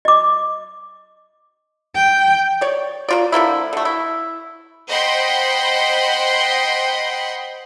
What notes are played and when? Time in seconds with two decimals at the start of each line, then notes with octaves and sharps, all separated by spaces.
0.05 D#5 D6
1.96 G5
2.61 C#5 D5
3.09 A#3 F4 D5
3.32 D3 F3 A#3 E4
3.73 D3 A3
3.85 E4
4.89 C5 D#5 F#5 G5 B5 C6